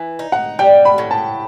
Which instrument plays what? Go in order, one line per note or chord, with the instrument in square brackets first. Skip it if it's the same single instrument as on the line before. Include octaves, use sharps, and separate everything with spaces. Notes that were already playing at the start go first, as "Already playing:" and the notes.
Already playing: [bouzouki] E3
D#4
[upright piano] F#5
[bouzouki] G3 [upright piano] G5
[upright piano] B5
[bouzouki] A2
[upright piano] A5